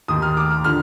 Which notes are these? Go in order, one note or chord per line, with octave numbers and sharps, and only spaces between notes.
D#2 D#3 D#6
F6
D6
F6
D3 F3 F6